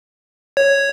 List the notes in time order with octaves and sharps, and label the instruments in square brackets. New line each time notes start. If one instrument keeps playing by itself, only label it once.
[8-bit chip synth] C#5